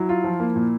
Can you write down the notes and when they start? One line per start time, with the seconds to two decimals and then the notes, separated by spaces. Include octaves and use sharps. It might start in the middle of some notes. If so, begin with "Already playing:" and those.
Already playing: F#3 E4
0.09 F4
0.24 F3
0.40 A#3
0.56 A#2